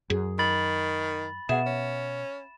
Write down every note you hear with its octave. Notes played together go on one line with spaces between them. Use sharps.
F#2 G#4
D#3 B5 A6 F#7
B2 G#4 E5 F#5 E7
C#4